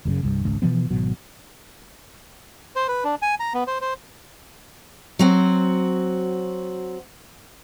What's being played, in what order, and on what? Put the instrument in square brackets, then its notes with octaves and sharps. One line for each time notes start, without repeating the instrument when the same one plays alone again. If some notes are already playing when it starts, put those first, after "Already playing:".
[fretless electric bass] F#1 F#2 A#2 C#3
C2 G2
G#1 C#2
B2 E3 F3 B3
G#1 B2 F#3
[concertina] C5
B4
D4
G#5
A#5
B3
C5
C5
[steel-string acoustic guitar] F#3 C4 F#4